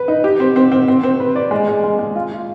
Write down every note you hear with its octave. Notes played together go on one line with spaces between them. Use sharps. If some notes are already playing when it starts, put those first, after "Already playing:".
Already playing: B4
D#4
G4
C4
C4
C4
C4
C4
B4
D5
G#3
G#3
G#3
G#3
F4
F4